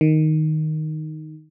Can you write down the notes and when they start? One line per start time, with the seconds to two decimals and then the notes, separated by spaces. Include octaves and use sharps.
0.01 D#3